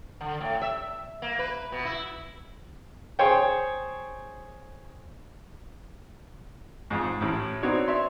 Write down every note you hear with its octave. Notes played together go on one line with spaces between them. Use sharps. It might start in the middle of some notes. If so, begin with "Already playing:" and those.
D3
A2
E5
A#3
B4
B2
E4
G#4 C5 C#5 G5
F2 G#2
A1 A2
B3 C4 D4 D#4 F#4 C#5
C#5 D5 E5 C6